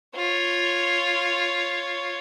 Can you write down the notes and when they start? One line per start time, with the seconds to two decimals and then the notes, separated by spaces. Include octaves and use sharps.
0.16 F4 C#5